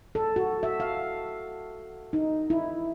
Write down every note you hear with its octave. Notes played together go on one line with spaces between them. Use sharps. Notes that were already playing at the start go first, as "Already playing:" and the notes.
A4
F#4
E5
F5
D#4
E4